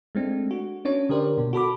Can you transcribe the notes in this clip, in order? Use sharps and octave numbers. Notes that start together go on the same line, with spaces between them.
G#3 A3 C4 D4
F#4
C#4 D4 C#5
D3 G4 A#4 C5 D5
B2
F#4 A4 B5 D6